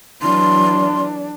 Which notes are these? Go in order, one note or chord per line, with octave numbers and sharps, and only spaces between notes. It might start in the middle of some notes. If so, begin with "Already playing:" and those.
E3 F#3 D4 C6